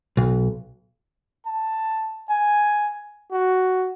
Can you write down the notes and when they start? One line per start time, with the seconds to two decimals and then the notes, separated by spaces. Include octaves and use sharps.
0.17 B1
1.46 A5
2.30 G#5
3.32 F#4